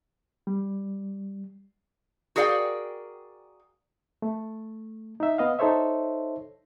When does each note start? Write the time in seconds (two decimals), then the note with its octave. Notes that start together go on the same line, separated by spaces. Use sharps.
0.47 G3
2.36 F#4 G#4 A#4 D5 F5 G5
4.22 A3
5.20 D#4 E5
5.38 B3 D#5 F5
5.59 D#4 A4 C5 C#5 E5